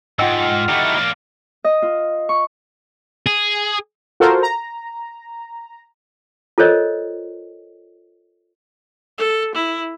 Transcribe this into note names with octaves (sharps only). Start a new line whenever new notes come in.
G#2 F4 D#5 F#5 G5 E6
F6
A3 D#4 E4 F#4 G4
A#3 D4
D#5
F4
C#6
G#4
F4 F#4 A4 A#4 C5
A#5
F4 A4 A#4 C5 C#5 D#5
A4
E4